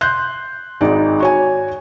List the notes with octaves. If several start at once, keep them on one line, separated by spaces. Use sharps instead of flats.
C6 F#6 G6
G#1 G#3 D#4 D5
F#4 C#5 G#5